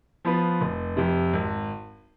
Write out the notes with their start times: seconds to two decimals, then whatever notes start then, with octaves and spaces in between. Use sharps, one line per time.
0.25 F3 B3 F4 B4
0.61 F1
0.97 F2 C3
1.33 G#1